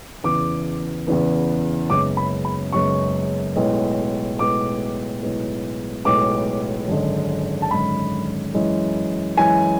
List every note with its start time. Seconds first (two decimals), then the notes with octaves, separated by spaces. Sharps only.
0.24 E2 C#3 E3 B3 D6
1.07 E2 C#3 E3 B3
1.90 F#1 F#2 C#3 G#3 B3 D6
2.17 B5
2.45 B5
2.73 F#1 F#2 C#3 G#3 B3 C#6
3.56 B1 A2 G#3 B3
4.39 B1 A2 G#3 B3 D6
5.22 B1 A2 G#3 B3
6.05 B1 A2 G#3 B3 D6
6.88 G#1 F#2 D3 G#3
7.62 A5
7.71 G#1 F#2 D3 G#3 B5
8.55 F#2 E3 G#3
9.37 F#2 E3 G#3 G#5